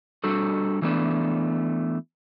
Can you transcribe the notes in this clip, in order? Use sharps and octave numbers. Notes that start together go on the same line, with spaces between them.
G3 D4 F#4 A4
E3 A3 B3 D4